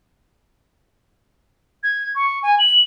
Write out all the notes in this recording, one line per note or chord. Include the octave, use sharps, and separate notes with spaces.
G#6
C#6
G#5
F#7